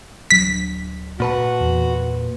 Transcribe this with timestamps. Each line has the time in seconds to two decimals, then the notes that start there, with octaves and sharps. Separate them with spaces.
0.31 D1 F#3 D4 B6
1.20 A#2 F#4 B4 A5
1.60 E2